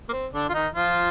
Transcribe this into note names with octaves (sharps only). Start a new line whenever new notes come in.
A#3
C4
D3 D4
F4
D#3 D#4
F3 F4